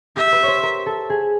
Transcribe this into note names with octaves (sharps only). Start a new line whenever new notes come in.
G4 E5
B4
C5 C#5
A#4
A4
G#4